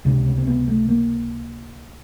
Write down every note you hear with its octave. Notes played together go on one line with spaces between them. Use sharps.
C#2 C3 D4
C#4
C4
B3
A3
A#3